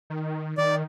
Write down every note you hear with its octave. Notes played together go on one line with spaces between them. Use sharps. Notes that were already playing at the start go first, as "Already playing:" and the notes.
D#3
D#3 D5